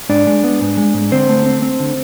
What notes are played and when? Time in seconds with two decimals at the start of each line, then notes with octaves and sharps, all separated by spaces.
0.09 G#2 D4 D5
0.27 G#3
0.44 B3
0.61 G#2
0.77 G#3
0.94 G#2
1.11 D3 C4 C5
1.29 A3
1.46 C4
1.62 C4
1.80 D3